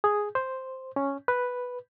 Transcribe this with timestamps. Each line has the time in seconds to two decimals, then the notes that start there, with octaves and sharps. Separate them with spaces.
0.04 G#4
0.35 C5
0.96 C#4
1.28 B4